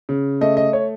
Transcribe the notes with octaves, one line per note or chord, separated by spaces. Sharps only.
C#3
A3 D#5
D#5
C#5